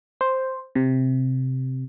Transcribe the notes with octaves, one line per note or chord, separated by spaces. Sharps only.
C5
C3